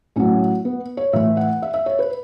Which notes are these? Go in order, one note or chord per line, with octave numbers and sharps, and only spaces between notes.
A2 F#3 C#4
B3
C#5
A2 E3 E5
F#5
E5
E5
C#5
B4